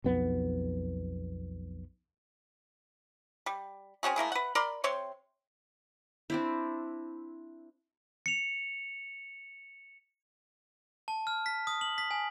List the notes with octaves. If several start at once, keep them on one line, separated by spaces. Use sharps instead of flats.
B1 F2 B3
G3
C4 C#4 F#4 G#4
A3 A#3 E4 G#4
B4 F#5
A#4 D5 B5 C6
C3 C4 C#5 C6
C4 D4 E4
C#7 F7
A5
F6
B6
D#6
F#7
B6
G#5